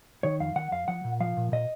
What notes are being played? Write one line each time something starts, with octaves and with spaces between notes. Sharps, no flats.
D#3 C#5
F2 F5
D#3 F#5
F2 F5
F3 F#5
A#2
F3 F5
A#2
A#2 D#5